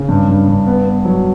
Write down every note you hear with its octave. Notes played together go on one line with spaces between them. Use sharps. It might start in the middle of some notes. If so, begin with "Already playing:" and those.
Already playing: C#3
G2
G2
G2
B3
B3
F#3